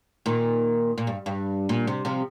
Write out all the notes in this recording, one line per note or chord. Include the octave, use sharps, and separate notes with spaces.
A#2 D#3
A#2
G2
G2
A#2
C3
C3 F3